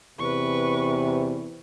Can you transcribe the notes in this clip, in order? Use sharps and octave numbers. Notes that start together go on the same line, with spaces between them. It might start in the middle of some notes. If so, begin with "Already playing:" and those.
E2 C3 B4 C#6